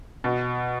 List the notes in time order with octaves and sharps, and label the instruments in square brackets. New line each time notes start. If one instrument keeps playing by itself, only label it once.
[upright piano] B2